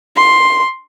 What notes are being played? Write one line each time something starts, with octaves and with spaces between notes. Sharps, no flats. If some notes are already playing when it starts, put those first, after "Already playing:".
C6